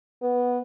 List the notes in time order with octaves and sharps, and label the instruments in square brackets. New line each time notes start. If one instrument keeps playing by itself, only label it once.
[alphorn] B3